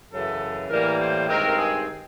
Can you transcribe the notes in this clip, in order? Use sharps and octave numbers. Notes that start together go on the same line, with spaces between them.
F#2 C#3 E3 A4
A2 E3 G3 A#3 A#4
C5
G2 D#3 G#3 C4 A#4
G#4